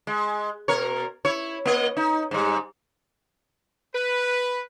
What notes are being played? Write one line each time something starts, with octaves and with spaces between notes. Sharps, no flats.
G#3
B2 A#4 C#5
E4 C#5
A#3 D#5
D#4
G#2 G3
B4